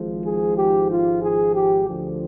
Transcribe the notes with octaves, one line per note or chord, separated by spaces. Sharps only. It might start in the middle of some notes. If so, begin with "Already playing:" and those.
Already playing: G#1 G#2 F3
G#4
G4
F4
G#4
G4
D2 D3 F3